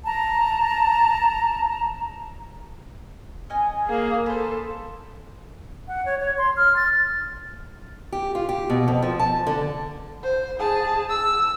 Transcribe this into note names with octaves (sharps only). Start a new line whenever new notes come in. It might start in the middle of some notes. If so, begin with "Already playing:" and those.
A5 A#5
C#4 D#5 G#5
A#3 G#4
A4 B4 C5
F#5
C#5
C#5
C6
F6
A6
G4
F4
G4
B2
F2
F3
A5
D3
C5
G#4 A5
E6